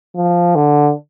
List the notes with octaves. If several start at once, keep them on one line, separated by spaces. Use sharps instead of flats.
F3
D3